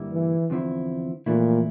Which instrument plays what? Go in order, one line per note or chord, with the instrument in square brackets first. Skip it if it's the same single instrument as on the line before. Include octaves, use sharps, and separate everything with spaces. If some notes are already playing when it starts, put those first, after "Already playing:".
Already playing: [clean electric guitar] G2 D3 G3 A#3 E4
[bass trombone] E3
[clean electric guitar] E2 D3 F3 C4 E4
[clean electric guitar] F2 E3 A3 E4 [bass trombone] A#2